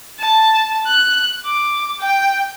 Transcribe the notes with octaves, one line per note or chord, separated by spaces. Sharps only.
A5
F#6
D6
G5